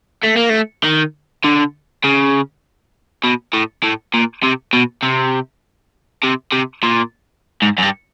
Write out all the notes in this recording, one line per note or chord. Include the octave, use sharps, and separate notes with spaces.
A3
A#3
A3
D#3
D3
C#3
B2
A2
A2
A#2
C3
B2
C3
C3
C3
A#2
G#2
F#2
G2